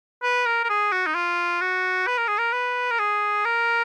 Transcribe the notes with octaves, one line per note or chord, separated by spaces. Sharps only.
B4
A#4
A#4
G#4
F#4
D#4
F4
F#4
B4
A#4
G#4
A#4
B4
A#4
G#4
A#4